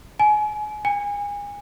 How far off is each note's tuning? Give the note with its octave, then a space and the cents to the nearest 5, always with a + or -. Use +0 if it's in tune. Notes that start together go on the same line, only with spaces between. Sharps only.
G#5 +30
G#5 -30